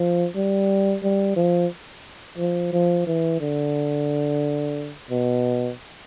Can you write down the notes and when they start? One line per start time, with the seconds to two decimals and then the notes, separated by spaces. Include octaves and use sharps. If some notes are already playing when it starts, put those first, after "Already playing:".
Already playing: F3
0.35 G3
1.03 G3
1.36 F3
2.38 F3
2.73 F3
3.07 E3
3.40 D3
5.10 B2